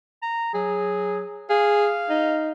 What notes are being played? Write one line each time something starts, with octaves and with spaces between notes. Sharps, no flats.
A#5
F#3 G#4
G#4 F5
D#4